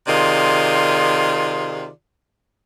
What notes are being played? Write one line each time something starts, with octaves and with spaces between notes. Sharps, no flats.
C3 D#3 F4 G#4 D5